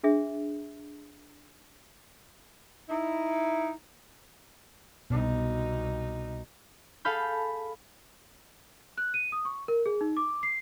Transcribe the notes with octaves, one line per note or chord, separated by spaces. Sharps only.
D4 G#4 E5
D#4 E4
C2 B2 D#4
G#4 A4 F5 B5 G6
F#6
D#7
D#6
C#6
A#4
G#4
D#4
D6
C7